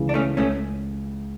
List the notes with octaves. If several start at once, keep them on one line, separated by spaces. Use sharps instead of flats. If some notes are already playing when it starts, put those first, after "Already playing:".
Already playing: C#2 C#3 E3
D4
A3 C#4
C#2 A3 C#4